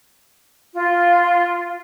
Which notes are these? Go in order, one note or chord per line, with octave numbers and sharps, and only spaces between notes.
F4